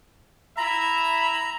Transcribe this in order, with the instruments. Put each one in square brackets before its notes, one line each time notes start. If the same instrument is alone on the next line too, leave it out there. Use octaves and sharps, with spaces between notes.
[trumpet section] E4 E5 B5 [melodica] A#5